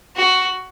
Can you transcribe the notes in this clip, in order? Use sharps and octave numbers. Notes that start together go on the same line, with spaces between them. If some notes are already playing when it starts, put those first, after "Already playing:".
F#4